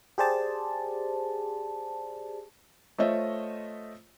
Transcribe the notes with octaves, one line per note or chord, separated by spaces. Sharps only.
G4 G#4 C5 D5 A5
A3 F4 C5 C#5 D#5 E5